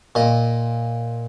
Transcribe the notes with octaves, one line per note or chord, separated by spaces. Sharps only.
A#2 D#5